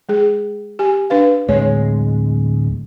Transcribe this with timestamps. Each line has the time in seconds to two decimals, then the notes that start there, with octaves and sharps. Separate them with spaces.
0.09 G#3 G#4
0.79 G4 G#5
1.10 D4 B4 F5
1.49 D1 G#3 C#5